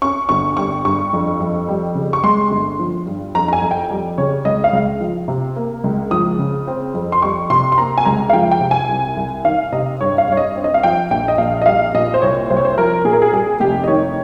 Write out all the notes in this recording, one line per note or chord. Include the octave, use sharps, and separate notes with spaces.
C#4 C#6
G1 C#6
G3 C#6
G2 C#6
F2
F2
G3
C#3
C#6
G#3 C6
G1
F3
G2
F2 A#5
A#5
G#5
F2
G5
G3
C#3 C#5
C#2 D#5
F5
C#2
F3
C3
A#3
C#2
F3 D#6
C#3
C4
F2
C6
G3 C#6
C3 C6
C6
A#3 A#5
G#5
C#2 A#5
F5
F3 G5
G5
C3
G#5
C2
C2
D#3 F5
C3 D#5
G2 C#5
F5
G2 C#5
D#5
C4
D#5
F5
F3 G5
A#1 G5
D#5
A#1 F5
D#5
G3 F5
A#2 D#5
C5
C2 C#5
C2 C5
C#5
C5
F3 A#4
A#2 G#4
A#4
G#4
G3 G#4
F1 G4
D#5
D#3 C#5